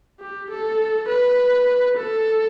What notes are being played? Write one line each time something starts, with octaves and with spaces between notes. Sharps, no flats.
G4
A4
B4
A4